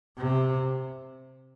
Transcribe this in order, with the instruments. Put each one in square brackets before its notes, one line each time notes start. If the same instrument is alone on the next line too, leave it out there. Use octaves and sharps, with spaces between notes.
[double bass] C3